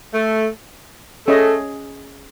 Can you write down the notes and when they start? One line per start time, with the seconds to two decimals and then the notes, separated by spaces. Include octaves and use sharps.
0.14 A3
1.28 A3 C#4 G#4 D#5